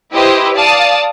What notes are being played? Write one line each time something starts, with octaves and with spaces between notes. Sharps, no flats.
E4 G4 B4 C5 D#5
D5 F5 A5 D#6